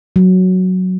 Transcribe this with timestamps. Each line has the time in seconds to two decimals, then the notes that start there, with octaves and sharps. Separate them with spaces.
0.16 F#3